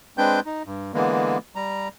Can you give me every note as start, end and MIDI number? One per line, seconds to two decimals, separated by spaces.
0.18 0.40 56
0.18 0.40 60
0.18 0.40 62
0.18 0.40 71
0.18 0.40 79
0.18 0.40 91
0.46 0.63 63
0.65 0.92 43
0.94 1.38 50
0.94 1.38 52
0.94 1.38 56
0.94 1.38 58
0.94 1.38 59
1.55 1.88 55
1.55 1.88 82